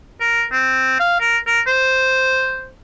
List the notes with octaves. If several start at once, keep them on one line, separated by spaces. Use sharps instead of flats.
A#4
C4
F5
A#4
A#4
C5